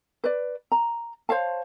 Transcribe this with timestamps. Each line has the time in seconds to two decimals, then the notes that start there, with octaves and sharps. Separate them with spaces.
0.24 B4 D5
0.72 A#5
1.29 C5 C#5 F5 A5